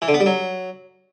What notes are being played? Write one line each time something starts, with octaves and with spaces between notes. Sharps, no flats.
E3
D3
B3
G3
F#3